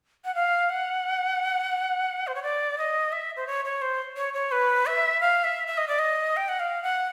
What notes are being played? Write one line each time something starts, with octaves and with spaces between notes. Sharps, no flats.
F#5
F5
F#5
C5
C#5
D5
D#5
E5
C5
C#5
C#5
C5
C#5
C#5
B4
E5
F5
E5
E5
D#5
D5
D#5
G5
F#5
F5
F#5